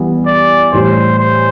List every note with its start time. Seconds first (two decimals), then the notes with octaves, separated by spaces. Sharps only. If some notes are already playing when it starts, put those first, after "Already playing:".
Already playing: E3 G3 B3
0.26 D5
0.72 A2 E3 G3 C5
1.19 C5